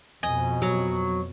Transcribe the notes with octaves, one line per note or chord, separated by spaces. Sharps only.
F2 B2 D#5 G#5
F#3